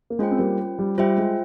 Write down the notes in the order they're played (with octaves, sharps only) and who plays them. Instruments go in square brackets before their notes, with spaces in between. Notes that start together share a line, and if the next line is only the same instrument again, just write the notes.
[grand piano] A#3
[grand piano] G#3 [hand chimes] C#4 F4 C5 G5
[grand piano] C4
G3 A#3
G3
[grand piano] G3 [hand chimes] F4 C5 E5 G5
[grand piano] G#3